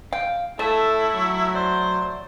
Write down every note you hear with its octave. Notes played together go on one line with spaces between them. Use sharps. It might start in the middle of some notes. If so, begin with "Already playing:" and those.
F5 G5
A3 E4 A4 C#5 E5 A5
F#3 C#6
C5 D5